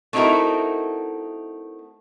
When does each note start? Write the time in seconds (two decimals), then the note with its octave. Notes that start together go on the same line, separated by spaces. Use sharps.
0.13 A3 C4 D#4 E4 F#4 A#4